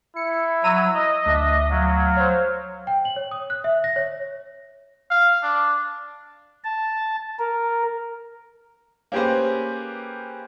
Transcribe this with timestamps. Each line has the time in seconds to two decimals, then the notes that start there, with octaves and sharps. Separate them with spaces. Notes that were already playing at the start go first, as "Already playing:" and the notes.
0.16 E4 C#7
0.64 F#3 A#5 E6 D#7
0.94 D#5
1.26 D2 D4 E5
1.71 F#3 F5
2.17 C5 C#5
2.87 G5
3.05 F#7
3.16 C#5
3.31 D#6
3.50 F#6
3.64 E5
3.84 A#6
3.96 C#5
5.11 F5
5.43 D4
6.64 A5
7.39 A#4
9.12 A#3 C#4 G4 G#4 B4 C5